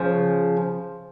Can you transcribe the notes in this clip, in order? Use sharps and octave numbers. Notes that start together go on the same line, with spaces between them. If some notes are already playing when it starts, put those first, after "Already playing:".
Already playing: C#3 F3